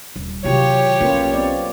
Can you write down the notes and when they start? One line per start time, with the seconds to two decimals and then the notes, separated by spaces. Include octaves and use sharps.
0.16 D#1
0.44 C3 D#3 F#3 F4 G4 C#5
1.00 B1 A#3 C#4 F4 B4
1.34 B3 C4 D5